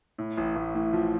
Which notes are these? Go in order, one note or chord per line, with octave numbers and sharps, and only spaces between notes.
A2
A1
A1
A2
F3